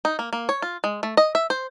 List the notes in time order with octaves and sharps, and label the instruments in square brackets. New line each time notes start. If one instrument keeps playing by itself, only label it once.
[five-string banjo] D#4
A#3
A#3
C#5
F4
G#3
A3
D#5
E5
C5